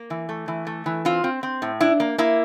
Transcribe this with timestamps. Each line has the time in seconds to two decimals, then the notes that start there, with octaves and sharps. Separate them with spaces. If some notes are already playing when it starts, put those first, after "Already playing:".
Already playing: A#3
0.10 E3
0.29 A3
0.48 E3
0.67 A3
0.86 E3
1.05 C4 F4
1.24 C4
1.43 C4
1.62 A2
1.81 D4 E4
2.00 A#3
2.18 A#3 E4